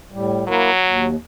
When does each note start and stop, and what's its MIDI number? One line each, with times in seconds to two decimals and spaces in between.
0.12 0.44 45
0.12 0.44 55
0.48 1.07 54
0.48 0.70 58
0.48 0.70 64
0.48 0.70 70
0.83 1.16 39